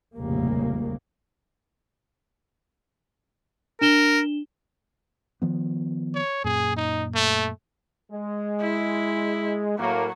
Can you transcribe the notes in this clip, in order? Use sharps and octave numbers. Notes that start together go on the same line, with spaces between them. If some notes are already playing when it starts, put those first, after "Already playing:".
F1 A#1 D#2 C#3 G3 A#3
D4 A#4 E7 G7
D#3 F3 B3
C#5
F#2 A#2 G#4
D#4
A3
G#3
E4
A2 F#3 A#3